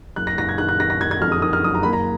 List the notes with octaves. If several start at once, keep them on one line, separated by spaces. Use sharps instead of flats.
F#1 F#6
A#6
F#1 A#6
G#6
D#3 F#6
F#6
D#3 A#6
A#6
F#1 G#6
G#6
F2 F6
D#6
D#3 D#6
F6
F#1 D#6
A#5
A#3 B5
A#5